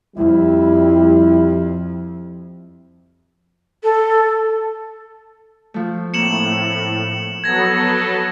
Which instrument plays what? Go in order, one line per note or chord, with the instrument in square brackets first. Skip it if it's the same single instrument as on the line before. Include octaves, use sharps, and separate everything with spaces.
[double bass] F2 [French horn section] G3 E4
[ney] A4
[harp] F3 A3
[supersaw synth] A2 [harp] A#3 C4 [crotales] C#7 E7 F#7
[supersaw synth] F#3 B3 A4 [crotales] G#6 A#6